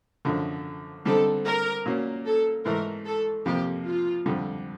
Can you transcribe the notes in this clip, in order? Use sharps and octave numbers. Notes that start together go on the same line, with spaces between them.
F#2 D3 F3 A3 D4
D3 G3 C4 D#4 A4
A#4
A#2 F#3 A#3 C#4
A4
G#2 E3 A3 A#4
A4
F2 C3 F3 A#3 G4
F4
F2 D3 G3